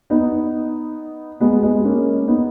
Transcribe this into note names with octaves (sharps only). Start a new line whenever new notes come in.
B3 D#4
G#3 B3
G#3 B3
A#3 C#4
B3 D#4